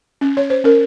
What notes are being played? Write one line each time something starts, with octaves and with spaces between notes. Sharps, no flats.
C#4
C#5
C5
C#4 A#4